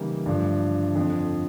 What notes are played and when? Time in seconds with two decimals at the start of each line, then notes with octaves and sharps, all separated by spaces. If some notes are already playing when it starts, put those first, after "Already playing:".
Already playing: C#3 E3 G3 A#3 D#4
0.26 G2 D3 F3 A3 D4
0.95 F2 D3 F3